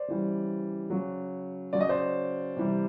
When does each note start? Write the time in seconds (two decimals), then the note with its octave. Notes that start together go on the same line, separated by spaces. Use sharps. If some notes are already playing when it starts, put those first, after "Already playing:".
Already playing: C5 D5
0.08 C#3 E3 G3
0.90 C#3 F#3
1.73 C#3 F#3 D5
1.80 D#5
1.89 C5 D5
2.56 C3 E3 G3